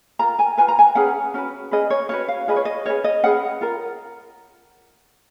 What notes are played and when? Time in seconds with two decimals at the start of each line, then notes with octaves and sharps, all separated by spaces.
0.19 F4 A#4 A#5
0.39 G#5
0.58 F4 B4 G#5
0.68 A#5
0.79 G#5
0.95 C#4 G#4 B4 F#5
1.34 C#4 F#4 B4
1.71 C#4 G#4 B4 D#5
1.90 C#5
2.09 C#4 F#4 B4 C#5
2.28 F5
2.47 F4 G#4 B4 D#5
2.56 C#5
2.65 D#5
2.86 C#4 F4 G#4 B4 C#5
3.04 D#5
3.23 C#4 G#4 B4 F#5
3.61 F4 A#4